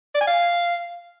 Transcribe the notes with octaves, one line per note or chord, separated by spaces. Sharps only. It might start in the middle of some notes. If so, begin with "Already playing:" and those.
D5
G#5
F5